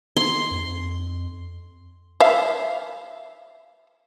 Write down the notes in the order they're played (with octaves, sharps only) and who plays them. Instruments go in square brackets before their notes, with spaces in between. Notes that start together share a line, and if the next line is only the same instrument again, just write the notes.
[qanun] C6
[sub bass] F2
[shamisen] E5 F5